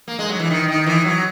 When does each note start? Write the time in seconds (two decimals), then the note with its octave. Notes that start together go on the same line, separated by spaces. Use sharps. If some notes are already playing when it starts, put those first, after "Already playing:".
0.08 A#3
0.19 G#3
0.29 F#3
0.40 E3
0.50 D#3
0.68 D#3
0.86 E3
1.05 F#3